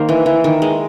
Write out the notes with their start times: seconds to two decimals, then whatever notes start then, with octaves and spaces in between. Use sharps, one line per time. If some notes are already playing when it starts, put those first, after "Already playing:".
Already playing: D#3 A#3 A#4 C5
0.09 E3
0.26 E3
0.44 D#3
0.62 G#3